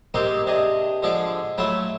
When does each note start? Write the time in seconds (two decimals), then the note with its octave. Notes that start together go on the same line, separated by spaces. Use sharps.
0.14 G#3 A#3 C4 D#4 G4 A#4
0.46 C3 D4 G#4 D#5
1.03 D3 F3 G#3 G#4 D5 D6
1.58 F#3 A3 E4 F4 E5